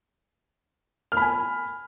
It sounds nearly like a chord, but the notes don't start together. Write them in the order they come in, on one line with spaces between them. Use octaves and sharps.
F6 B5 G#5